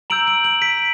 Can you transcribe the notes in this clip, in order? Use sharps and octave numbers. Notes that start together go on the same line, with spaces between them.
A#5 E6 G6 D7 F#7
D7 F#7
D7 F#7
B6 D7